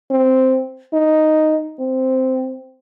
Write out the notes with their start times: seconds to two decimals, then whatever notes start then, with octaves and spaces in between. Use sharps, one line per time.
0.10 C4
0.93 D#4
1.79 C4